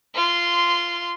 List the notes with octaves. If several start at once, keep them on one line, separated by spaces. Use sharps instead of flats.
F4 C6